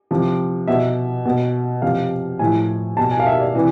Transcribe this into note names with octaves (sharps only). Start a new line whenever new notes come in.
C3 F3
B2 E5
B2
C3 F3 F5
A2 F3 G#5
B2 A5
G#5
F5
E5
D5
C3 E3